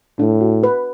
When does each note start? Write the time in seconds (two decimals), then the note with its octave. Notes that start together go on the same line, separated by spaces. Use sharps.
0.19 A2 D4
0.41 F#4
0.63 B4